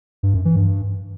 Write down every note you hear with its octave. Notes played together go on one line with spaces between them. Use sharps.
G2
F#2
E3
G2